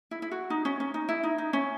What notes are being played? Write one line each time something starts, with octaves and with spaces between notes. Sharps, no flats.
E4
E4
F#4
D#4
C#4
C#4
D#4
E4
D#4
D#4
C#4